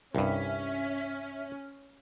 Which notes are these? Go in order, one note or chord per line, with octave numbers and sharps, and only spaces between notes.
C2 G2 C#4 E5